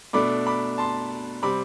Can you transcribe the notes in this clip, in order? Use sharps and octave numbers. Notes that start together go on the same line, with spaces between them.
B2 A3 D4 B5 D6
B5 D6
A5 C6
C3 G3 C4 B5 D6